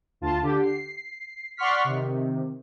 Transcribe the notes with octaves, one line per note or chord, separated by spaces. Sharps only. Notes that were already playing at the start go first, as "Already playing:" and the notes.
D2 F4 A5
D3 G4
C7
D5 F#5 C6 C#6 F6 B6
C3 D#3